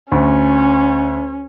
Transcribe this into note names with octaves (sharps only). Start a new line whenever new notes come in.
D2 C#4